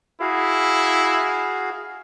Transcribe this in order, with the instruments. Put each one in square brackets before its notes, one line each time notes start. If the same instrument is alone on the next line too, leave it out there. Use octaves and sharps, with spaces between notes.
[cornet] E4 [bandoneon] F#4 G#4 F5